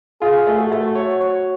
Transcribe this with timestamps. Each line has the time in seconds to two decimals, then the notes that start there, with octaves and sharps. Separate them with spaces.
0.22 F4 G#4
0.47 A3
0.59 F#4
0.72 A3
0.95 C#5
1.21 C#5